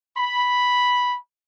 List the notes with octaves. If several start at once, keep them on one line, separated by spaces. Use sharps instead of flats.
B5